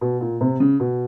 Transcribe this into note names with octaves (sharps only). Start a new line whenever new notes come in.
B2
A#2
C3
C#3
B2